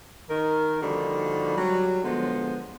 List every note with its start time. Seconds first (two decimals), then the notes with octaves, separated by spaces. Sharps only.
0.30 D#3 A#4
0.82 D3 F3 G3 A#3 D#4 F#4
1.57 F#3 G3
2.04 D3 F3 G#3 B3